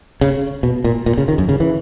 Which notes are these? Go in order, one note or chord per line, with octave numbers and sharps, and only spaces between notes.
C#3
B2
A#2
A#2
C#3
D#3
F#2
C#3
E3